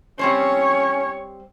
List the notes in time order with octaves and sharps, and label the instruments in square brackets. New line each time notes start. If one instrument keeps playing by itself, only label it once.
[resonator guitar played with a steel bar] G3 C4 C5 [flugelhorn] C#4 [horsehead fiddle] C#5